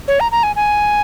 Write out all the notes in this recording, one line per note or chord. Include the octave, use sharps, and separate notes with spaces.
C#5
A#5
A#5
G#5
G#5